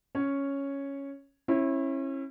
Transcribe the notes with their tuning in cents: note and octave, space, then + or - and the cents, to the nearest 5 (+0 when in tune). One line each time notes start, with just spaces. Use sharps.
C#4 +0 C#5 +0
C#4 -35 E4 +0